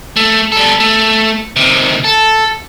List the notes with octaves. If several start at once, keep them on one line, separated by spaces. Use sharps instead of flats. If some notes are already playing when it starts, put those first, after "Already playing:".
A3
G3 A4
A3
C3 D#3
A4